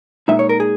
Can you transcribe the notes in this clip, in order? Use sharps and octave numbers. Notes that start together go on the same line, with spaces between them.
A#2 G#3 D#4 E5
C#5
A#4
G#4